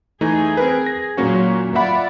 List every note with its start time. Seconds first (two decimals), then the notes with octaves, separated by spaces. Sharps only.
0.21 E3 A3 D#4 G#4
0.57 C4 A#4 B4
0.86 A#6
1.17 A#2 F#3 A#3 C#4 F#4
1.75 F4 D5 E5 F#5 B5